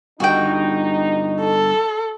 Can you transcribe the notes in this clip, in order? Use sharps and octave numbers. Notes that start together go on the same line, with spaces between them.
G2 D3 D#4 F#4 F#5 G5
A4